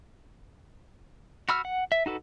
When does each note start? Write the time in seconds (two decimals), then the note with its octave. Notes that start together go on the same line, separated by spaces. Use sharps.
1.49 F#4 B5 E6 F6
1.65 F#5
1.92 E5
2.06 D#4 F#4 A4 B4